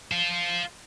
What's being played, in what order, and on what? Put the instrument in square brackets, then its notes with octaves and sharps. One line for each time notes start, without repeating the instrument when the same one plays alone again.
[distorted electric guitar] F4 C5